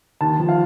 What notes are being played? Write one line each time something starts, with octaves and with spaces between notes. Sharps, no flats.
D#2 A5
F3
F5